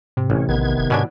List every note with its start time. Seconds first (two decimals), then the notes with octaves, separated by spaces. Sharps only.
0.17 G#2 C3
0.30 A1 C#4
0.49 A#1 D#3 B3 G#6
0.79 F#1
0.90 G#2 B2 C#4 D4